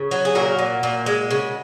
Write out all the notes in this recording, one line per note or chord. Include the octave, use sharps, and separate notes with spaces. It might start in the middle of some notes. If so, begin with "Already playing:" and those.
Already playing: C#3
F#3
G#4
A#2 F#4 A#4
A#2
A#2
G#3
C#3